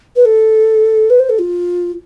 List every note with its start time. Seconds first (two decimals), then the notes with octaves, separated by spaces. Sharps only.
0.16 B4
0.25 A4
1.10 B4
1.19 C5
1.29 A4
1.39 F4